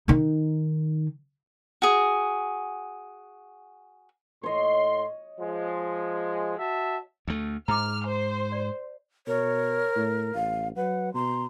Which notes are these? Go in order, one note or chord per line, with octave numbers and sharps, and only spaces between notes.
D#3 D#4
F#4 G#4
A2 C#5 D#5 C6
F3 G#3
F#4 E5 A5
D2 A3
G#2 A#5 D6 F6
C5
D5
B2 A#4 C#5
A2
A1 F5
F#3 B4 F#5
B2 A#5 C6